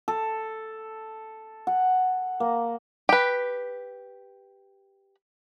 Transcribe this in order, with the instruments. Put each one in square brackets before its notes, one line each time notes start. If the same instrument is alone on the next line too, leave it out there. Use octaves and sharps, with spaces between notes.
[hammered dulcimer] A4
F#5
A#3
[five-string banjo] G4 B4